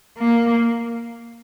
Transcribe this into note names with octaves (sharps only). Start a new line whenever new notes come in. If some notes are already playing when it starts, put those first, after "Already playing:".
A#3